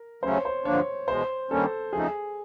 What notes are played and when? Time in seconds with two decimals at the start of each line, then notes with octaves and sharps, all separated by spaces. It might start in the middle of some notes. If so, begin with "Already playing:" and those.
Already playing: A#4
0.23 C#3 F#3 A3 C#4 C5
0.33 C#5
0.45 C5
0.65 G2 D3 F3 A#3 D4 C#5
1.08 E2 B2 G#3 C5
1.51 G2 D#3 G3 A#3 C#4 A4
1.93 C#3 F3 A3 C4 D#4 G#4